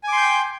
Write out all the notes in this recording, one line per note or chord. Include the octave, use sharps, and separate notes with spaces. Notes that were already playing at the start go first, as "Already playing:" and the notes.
G5 G#5 C6 D6 G6